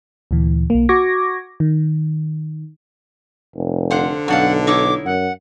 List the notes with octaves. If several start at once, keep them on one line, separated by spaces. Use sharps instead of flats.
D2 A#2 E3
B1 A#3
F#4 C#6 D6 G#6 A#6
D#3
F1
D3 C5 F5 F#5
B1 F#2 D4 F5 F#5
D#4 E4 C#5 D6
F#2 F#5